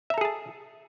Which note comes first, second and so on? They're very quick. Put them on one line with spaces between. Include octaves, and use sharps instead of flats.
E5 A#5 A4 G#4 A5